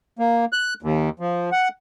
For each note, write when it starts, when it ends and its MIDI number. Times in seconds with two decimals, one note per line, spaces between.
0.19 0.45 58
0.53 0.74 90
0.83 1.09 39
1.20 1.50 53
1.52 1.68 78